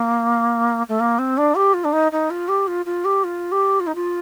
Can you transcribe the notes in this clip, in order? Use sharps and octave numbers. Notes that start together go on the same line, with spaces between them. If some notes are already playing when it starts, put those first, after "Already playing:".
Already playing: A#3
A3
A#3
C4
D4
G4
F4
D4
D#4
D#4
F4
G4
F4
F4
G4
F4
G4
F4
D#4
F4